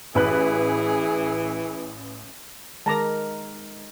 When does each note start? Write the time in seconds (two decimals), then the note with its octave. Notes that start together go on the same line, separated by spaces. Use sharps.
0.15 A1 E3 G#4 B4 F#6
2.86 D#3 G#3 A#4 A5 A#5 D6